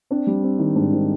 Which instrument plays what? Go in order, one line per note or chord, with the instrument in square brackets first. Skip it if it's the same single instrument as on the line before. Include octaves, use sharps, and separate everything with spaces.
[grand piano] C4 D4
G3
C4
D#3
G#2 D4
D#3